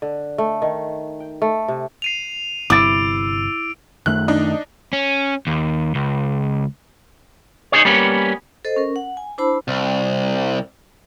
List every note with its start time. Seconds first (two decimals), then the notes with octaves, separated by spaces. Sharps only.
0.02 D3
0.38 A3
0.62 D#3
1.20 G5
1.42 A3
1.68 C3
2.02 C7 D#7 F7
2.70 G1 G2 C3 E4 D6 E6 A6 D7
4.06 F#2 D#3 A3 F#6
4.28 D4 D#4 D#5
4.93 C#4
5.47 D#2
5.95 C#2
7.72 D#4 F4 G#4 C#5
7.85 G3 A#3 B3 C#4
8.65 A4 C5 D#5
8.76 C#4 A#4
8.96 F#5
9.17 G#5
9.38 D4 E4 C5 A5 B5 E6
9.68 C2